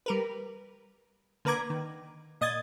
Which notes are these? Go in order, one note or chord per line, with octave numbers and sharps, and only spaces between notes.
G3 A#4 B4
D3 A#3 B4 A#5 D6 G#6
D#3
A#2 D#5 D#6 G#6 A6